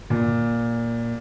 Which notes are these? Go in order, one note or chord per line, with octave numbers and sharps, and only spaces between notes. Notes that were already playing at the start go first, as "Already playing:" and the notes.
A#2